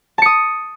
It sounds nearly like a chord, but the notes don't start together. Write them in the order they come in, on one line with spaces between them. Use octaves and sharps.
A5 C#7 D#6